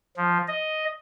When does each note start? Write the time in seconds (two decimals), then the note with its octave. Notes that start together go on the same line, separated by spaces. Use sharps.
0.17 F3
0.47 D#5